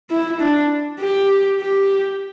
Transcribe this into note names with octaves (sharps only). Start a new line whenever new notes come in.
E4
D4
G4
G4